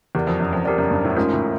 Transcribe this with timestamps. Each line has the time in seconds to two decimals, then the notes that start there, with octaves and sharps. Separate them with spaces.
0.15 E2 G4 A#4 D5
0.27 F2
0.40 F#2
0.53 F2
0.65 F2 G4 A#4 D5
0.78 F#2
0.91 G2
1.05 A2
1.16 G#2 A3 C#4 F4 A#4
1.33 A2